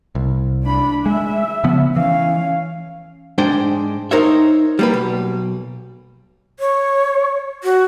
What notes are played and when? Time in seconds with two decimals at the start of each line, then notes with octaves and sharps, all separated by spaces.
0.15 C2
0.64 D4 B5
1.06 G#3 E5
1.64 C#3 F3 B3
1.96 E3 C#4 F5
3.38 G#2 G#3 D4 C5 G5
4.11 D#4 A#4 C5 C#5 E5
4.79 G3 A#3 B4
4.94 B1
6.60 C#5
7.64 F#4